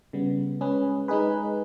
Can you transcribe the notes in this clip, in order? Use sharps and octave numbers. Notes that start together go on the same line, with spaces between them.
C#3 G3 B3
G#3 C#4 G#4 B4
G#3 D#4 G#4 B4